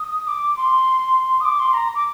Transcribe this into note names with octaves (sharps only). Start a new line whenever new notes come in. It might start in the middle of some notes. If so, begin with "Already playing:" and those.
Already playing: D#6
D6
C6
D#6
D6
C6
A#5
D6